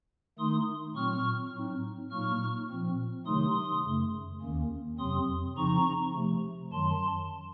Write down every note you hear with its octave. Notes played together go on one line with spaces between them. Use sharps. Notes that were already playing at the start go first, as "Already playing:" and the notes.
D#3 A3 D#4 C6 D#6
A#2 F#3 C4 C#6 F6
A2 F#3 C4 D#4
A#2 F#3 A#3 D#4 C#6 F6
A#2 F3 C4
C3 D#3 F#3 A3 D#4 C6 D#6
F#2 C#3 A3
D#2 D#3 A#3 C#4
F2 C3 F#3 C4 C6 D#6
C#3 F3 C4 D#4 A#5 C#6
C3 F3 A3
F#2 D#3 F#3 A5 C6